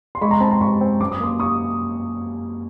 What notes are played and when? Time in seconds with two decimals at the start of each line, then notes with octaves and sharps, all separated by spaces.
0.15 C6
0.21 G#3 B5 C#6
0.31 A#5 C6
0.41 C4 A5 B5
0.51 A#5 C6
0.60 F#2 B5 C#6
0.81 C4
1.00 F#2 D6
1.12 D#6
1.21 A#3 C6 D6
1.39 C#6 D#6